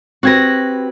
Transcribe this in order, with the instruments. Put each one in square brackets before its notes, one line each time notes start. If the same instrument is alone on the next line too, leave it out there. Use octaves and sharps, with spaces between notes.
[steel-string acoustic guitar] C4 G4 B4 [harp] F#4 G#6 A#6